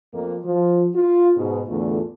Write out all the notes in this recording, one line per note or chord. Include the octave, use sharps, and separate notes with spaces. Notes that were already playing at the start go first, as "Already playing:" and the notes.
F2 A#3
F3
F4
G#2 B2
E2 A2 D3 A3 F4